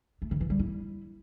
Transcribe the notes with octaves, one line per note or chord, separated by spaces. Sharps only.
A3
D#3
E3
G3
E4